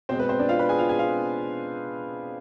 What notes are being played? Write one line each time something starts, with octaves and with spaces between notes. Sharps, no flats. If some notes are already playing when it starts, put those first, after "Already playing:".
B2 G#3 C4 C5
B4
C4 C5
D4 D5
F4 F5
B4 B5
G#4 G#5
F4 F5
G#4 G#5
F4 F5